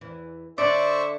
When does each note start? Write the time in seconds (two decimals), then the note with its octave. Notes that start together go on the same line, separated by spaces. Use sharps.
0.01 E2 E3
0.58 D3 D4 C5 D5 E5 C#6